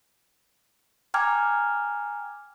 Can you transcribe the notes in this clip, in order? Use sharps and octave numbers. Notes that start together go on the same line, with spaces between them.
G5 G#5 A#5 D6 F6 G#6